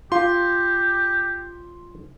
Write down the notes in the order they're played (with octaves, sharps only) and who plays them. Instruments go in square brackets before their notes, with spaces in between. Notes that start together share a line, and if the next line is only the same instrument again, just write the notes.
[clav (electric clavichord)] F4 [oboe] G4 [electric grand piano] C6